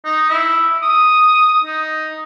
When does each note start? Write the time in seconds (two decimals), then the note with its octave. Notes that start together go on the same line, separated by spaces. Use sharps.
0.05 D#4
0.29 E4
0.82 D#6
1.64 D#4